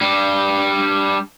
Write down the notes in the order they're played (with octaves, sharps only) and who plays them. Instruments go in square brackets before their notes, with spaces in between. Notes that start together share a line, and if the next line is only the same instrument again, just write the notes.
[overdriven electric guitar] G3 D4